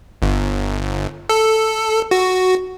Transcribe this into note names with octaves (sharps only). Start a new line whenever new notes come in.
G1
A4
F#4